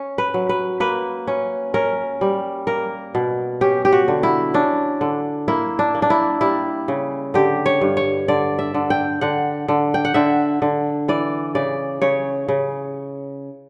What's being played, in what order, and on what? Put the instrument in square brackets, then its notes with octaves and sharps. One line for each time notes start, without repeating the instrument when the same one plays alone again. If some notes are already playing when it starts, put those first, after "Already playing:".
Already playing: [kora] C#4
B4
F#3
B4
A#3 B4
C#4
C#4 A#4
G3
A#3 A#4
B2
C#4 G4
G4
F#4
D3
E4
C#4 D4
D3
A#3 E4
D4
A#3
D4
E4
G3 E4
C#3
D3 G4
C#5
G2
C#5
D3 D5
E5
D3
G5
D3 F#5
D3
G5
F#5
D3 E5
D3
E3 D5
C#3 D5
C#3 C#5
C#3